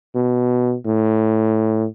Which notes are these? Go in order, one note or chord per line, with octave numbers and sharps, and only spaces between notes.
B2
A2